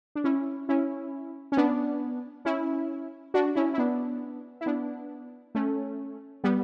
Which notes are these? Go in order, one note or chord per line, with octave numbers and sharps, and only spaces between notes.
D4
C#4 E4
C#4 E4
C#4
B3 D4
C#4 E4
D4 F#4
C#4 E4
E4
B3 D4
E4
B3 D4
A3 C#4
G3 B3